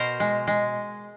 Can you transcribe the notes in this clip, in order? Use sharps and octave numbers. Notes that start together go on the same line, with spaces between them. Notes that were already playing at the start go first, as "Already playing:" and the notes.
Already playing: B2 A#4 C5
G#3
G#3